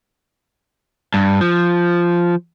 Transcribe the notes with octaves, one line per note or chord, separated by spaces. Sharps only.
G2
F3